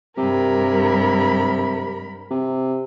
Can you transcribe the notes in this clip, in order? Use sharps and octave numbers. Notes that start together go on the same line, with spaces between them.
G2 C3 A#4 B5
C3